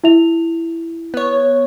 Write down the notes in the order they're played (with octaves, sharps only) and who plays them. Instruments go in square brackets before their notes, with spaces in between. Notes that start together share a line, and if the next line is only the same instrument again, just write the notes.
[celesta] E4 E5 F7
[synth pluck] B3 C#5